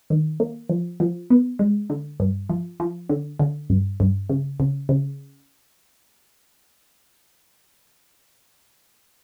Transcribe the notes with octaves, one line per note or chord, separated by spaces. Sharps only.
D#3
A#3
F3
F3
B3
G#3
D3
G2
F3
F3
D3
D3
G2
G2
C#3
C#3
C#3